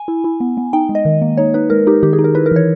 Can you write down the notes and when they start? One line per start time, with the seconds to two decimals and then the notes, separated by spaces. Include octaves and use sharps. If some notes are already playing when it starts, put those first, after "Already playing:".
Already playing: G#5
0.08 E4
0.24 E4
0.40 B3
0.57 B3
0.73 D#4 G5
0.89 G#3
0.95 D#5
1.05 D#3
1.22 A#3
1.37 D#4 C#5
1.54 D#4 B4
1.70 G#3 A#4
1.87 D#4 G4
2.03 D#3 G4
2.13 G#4
2.19 D#4
2.24 A#4
2.35 E4 B4
2.46 A#4
2.51 E3 C#5